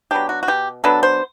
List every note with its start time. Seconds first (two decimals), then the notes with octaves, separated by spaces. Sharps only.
0.11 F#3 B3 D4 G4
0.29 F#4
0.43 F#4
0.48 B2 G4
0.84 F#3 B3 D4 A4
1.03 C5